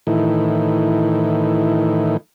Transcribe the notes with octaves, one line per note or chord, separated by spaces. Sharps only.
A2 D#3 E3